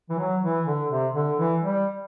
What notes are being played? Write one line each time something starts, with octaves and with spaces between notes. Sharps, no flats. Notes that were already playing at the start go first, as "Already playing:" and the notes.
E3
F#3
E3
D3
C3
D3
E3
G3